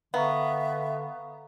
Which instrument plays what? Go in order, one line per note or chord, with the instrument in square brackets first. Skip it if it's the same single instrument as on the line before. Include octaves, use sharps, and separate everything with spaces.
[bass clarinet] D3 [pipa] B3 [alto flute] E5 [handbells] F5 A#5 C#6